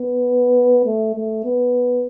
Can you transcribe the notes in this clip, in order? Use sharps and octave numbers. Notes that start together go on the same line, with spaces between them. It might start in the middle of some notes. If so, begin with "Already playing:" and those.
Already playing: B3
A3
A3
B3